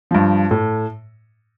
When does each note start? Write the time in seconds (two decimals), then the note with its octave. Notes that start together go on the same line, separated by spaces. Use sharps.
0.11 G2 F3
0.51 A2